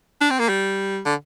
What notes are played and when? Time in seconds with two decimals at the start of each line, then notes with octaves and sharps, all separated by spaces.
0.21 D4
0.31 C4
0.39 A#3
0.49 G3
1.06 D3